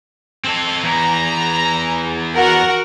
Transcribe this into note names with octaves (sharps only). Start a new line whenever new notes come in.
C4 A4
E2 E3 A#5
F#4 A#4 F#5